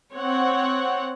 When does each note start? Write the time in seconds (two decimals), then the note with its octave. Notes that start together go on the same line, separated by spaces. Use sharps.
0.12 C4 C#5 F#5